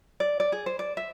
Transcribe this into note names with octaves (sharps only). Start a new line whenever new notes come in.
D5
D5
G#4
C5
D5
E5